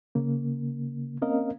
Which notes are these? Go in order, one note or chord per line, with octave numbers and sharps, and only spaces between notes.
C#3 A#3
A#3 C4 C#4 A#4 D#5 F5